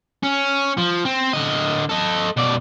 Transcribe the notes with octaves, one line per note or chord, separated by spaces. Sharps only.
C#4
F3
C4
D3 D#5
A4 D#5
B2 D5